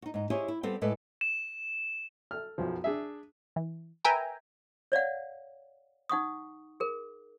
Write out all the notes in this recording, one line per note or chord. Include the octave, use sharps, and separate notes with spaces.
D#4 F#4
G#2 D#4
E4 G4 G#4 C5 C#5 D#5
E4
G3 B3 C4 F4 G4 A4
A2 G#3 A4 B4 D5
E7
A4 F6
B1 F#2 F3
D4 G#4 E5
E3
A#4 B4 E5 G5 G#5 A#5
C#5 D5 F5 F#5
D#4 F#5 C#6 D#6
G#4 A#4